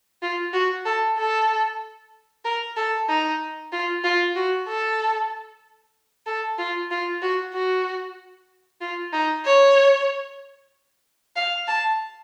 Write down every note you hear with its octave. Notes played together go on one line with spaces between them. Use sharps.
F4
F#4
A4
A4
A#4
A4
D#4
F4
F4
F#4
A4
A4
F4
F4
F#4
F#4
F4
D#4
C#5
F5
A5